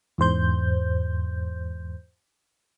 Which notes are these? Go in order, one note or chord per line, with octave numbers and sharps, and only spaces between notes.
E2 G#2 C5 G6